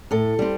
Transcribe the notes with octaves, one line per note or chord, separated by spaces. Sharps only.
A2 A4
G3 C4